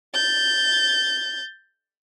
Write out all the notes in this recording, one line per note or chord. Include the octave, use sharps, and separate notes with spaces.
G6 A6